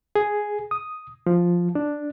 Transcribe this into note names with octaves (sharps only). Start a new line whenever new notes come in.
G#4
D#6
F3
D4